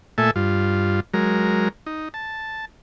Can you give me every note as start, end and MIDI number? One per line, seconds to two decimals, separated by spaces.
0.18 0.31 46
0.18 0.31 57
0.18 0.31 69
0.18 0.31 76
0.18 0.31 80
0.36 1.00 43
0.36 1.00 65
1.14 1.68 54
1.14 1.68 56
1.14 1.68 70
1.87 2.09 63
2.14 2.65 81